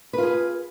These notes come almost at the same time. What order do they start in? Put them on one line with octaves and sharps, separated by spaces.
B4 F4 G#4